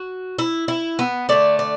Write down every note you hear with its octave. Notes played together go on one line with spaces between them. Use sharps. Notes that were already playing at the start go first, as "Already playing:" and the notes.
Already playing: F#4
E4
E4
B3
D3 A3 D5
D5